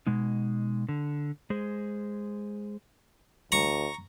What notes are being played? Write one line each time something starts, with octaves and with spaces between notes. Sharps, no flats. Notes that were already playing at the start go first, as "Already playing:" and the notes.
B2 G#3 D#4
D3
G#3 G#4 C5
D2 A#5 C#6